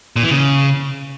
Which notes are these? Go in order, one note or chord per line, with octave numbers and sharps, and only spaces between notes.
A#2
E3
C#3